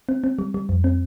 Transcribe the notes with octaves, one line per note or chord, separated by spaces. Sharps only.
C4
C4
G3
G3
F2
C4